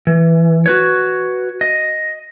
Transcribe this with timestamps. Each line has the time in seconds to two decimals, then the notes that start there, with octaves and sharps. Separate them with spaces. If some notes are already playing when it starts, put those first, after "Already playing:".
0.07 E3
0.66 F#4 B4 C#5
1.61 D#5